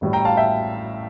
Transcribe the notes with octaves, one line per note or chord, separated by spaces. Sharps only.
A1 A2 G3
G5 A#5
F5 A5
E5 G5